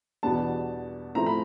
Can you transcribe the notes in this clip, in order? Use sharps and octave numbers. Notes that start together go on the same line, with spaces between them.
E2 B2 G3 B3 D4 A5
A2 F3 A3 C4 E4 A#5
B5